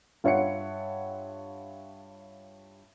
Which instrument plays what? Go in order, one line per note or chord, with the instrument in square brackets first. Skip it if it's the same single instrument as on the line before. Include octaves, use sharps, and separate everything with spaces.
[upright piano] G2 F4 C#5 E5 F#5 C#7